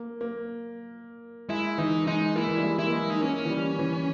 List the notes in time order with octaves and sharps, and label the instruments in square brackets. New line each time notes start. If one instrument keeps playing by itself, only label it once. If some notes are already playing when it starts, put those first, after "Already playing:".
Already playing: [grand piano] A#3
A#3
[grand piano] G#3 [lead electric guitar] E4
[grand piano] E3 [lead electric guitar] D#4
[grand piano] G#3 [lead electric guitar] D#4
[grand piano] A#3 [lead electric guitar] E4
[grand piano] E3
G3
G#3
[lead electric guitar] E4
[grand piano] A#3
G#3
[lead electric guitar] D#4
[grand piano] A#3 [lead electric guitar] C#4
[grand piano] E3
G3
E3